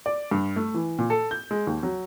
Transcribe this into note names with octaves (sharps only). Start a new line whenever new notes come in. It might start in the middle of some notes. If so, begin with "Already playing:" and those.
D5
G2
A3
E3
A#2
A4
G6
G#3
D#2
F#3